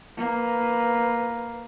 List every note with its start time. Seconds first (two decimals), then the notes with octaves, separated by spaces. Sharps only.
0.18 A#3 B4